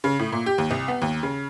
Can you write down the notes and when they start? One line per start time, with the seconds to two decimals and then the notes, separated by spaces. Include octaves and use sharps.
0.04 C#3
0.19 A2
0.32 A#2
0.46 G4
0.58 D#2
0.71 C2
0.88 B3
1.02 D#2
1.23 C#3